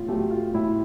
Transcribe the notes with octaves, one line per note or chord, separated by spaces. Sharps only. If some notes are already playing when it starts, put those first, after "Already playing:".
Already playing: A2 F4
F#3 A3 G4
F4
A2 E4